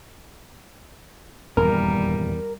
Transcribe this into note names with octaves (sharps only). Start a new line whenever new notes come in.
D#1 E2 G2 G3 A#4